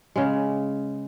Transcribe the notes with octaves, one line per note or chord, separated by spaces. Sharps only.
C#3 G#3